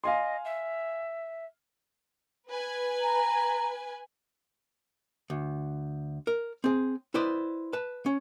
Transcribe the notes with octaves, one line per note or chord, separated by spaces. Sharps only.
D#5 F5 G#5 C6
E5
B4 G#5
A#5
D2
A#4
C4 G#4
E4 B4 C5 D5 D#5
B4 A5
C#4